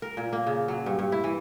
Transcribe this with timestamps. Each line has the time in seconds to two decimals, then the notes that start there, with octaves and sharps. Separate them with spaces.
0.02 A#4
0.17 A#2
0.33 A#3
0.47 C#3
0.68 F#3
0.86 G2
0.99 G2
1.12 E4
1.24 E3